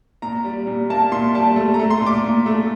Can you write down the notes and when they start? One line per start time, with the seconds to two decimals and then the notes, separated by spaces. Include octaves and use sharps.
0.22 A#2 A#5
0.44 G3
0.67 A#2
0.90 A#3 A5
1.12 A#2 C6
1.35 G3 A5
1.56 A3
1.74 A#5
1.79 A3
1.90 C6
2.02 A#2 D6
2.24 A#2
2.46 A3